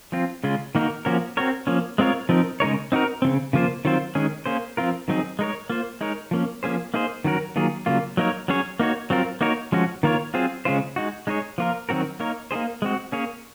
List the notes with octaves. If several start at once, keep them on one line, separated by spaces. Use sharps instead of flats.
F3 C4 F4
C#3 G#3 C#4 F4
D#3 A#3 D#4 F#4 A#4
F3 A#3 C#4 F#4 A#4
C4 F#4 A#4 C#5
F3 A#3 C#4
G#3 C4 F4 A#4 C#5
F3 C4 D#4 A#4
C#3 G#3 D#4 A#4 C#5
C4 D#4 F#4 A#4
C#3 F3 C4
C#3 F3 A#3 F4 C5
D#3 F#3 C4 F4 C5
D#3 G#3 C#4 G#4
A#3 C#4 G#4 C5
F3 C4 F4 A#4
D#3 F#3 C4 D#4 G#4
G#3 D#4 A#4 C#5
A#3 F4 C5
G#3 D#4 A#4 C#5
F3 A#3 C#4
F3 A#3 C#4 G#4 C5
A#3 D#4 G#4 C5
D#3 F#3 C#4 F#4 A#4
D#3 F#3 A#3 F4 G#4
C#3 F#3 A#3 F4
F#3 A#3 D#4 A#4 C#5
F#3 C#4 G#4 C#5
A#3 D#4 F#4 C#5
F#3 C4 F4 A#4
A#3 D#4 F#4 A#4 C#5
F3 G#3 C#4 F#4
D#3 A#3 F4 A#4 C#5
F#3 C4 F4 G#4 C5
C#3 G#3 C#4 F4 C5
G#3 D#4 F#4
G#3 D#4 G#4 C#5
F3 A#3 F4 A#4
D#3 F#3 C4 F#4 A#4
A#3 D#4 A#4 C#5
A#3 D#4 G#4 C5
G#3 C4 F#4
A#3 C#4 G#4 C#5